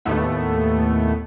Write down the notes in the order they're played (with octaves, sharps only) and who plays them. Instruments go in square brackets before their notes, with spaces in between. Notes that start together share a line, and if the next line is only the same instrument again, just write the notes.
[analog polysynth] D#2 A2 A3 B3